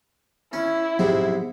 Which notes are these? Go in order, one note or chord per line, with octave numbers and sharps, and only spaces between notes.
C#4 E4
G#2 C3 F3 F#3 B3